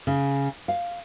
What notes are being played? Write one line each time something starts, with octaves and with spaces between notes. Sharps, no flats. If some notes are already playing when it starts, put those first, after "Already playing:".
C#3
F5